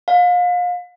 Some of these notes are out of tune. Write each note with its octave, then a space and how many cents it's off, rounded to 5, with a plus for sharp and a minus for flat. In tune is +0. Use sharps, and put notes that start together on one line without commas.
F5 +35